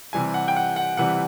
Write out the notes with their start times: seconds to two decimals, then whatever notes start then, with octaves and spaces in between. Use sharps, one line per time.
0.13 C3 E3 G3 G#5
0.34 F#5
0.48 G5
0.56 F#5
0.76 F#5
0.97 C3 E3 G3 F#5